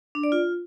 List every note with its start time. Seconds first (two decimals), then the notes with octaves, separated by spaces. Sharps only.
0.15 D4
0.23 D5
0.32 F4